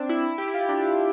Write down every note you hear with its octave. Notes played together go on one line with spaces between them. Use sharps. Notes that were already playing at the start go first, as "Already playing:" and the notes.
Already playing: C4 D4
E4
E4
G4
E4
F4
D4